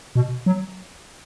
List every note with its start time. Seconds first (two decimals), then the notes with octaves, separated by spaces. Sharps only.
0.15 B2
0.46 F#3